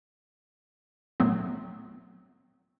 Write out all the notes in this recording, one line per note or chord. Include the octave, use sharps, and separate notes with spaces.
A#2 F#3 A3 B3 C4